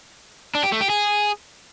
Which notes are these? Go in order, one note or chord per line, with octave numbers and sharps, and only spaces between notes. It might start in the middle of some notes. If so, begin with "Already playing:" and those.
D4
G4
A3
G4
G#4